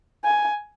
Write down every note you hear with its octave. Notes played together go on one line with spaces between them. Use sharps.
G#5